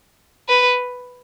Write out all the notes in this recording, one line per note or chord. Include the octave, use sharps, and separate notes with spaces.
B4